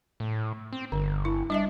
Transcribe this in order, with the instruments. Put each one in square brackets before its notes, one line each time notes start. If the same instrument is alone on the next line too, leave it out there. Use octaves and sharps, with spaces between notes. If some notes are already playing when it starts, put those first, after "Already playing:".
[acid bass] A2
C4
[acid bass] G1 [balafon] D3
[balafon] E4
[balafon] G3 D#5 E5 [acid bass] D4